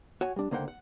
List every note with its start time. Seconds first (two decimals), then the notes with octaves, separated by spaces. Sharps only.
0.21 F#4 C#5 F#5 G#5
0.36 G3 D4
0.51 C#2 D3 A#3 C5 F#5 G5
0.68 F#5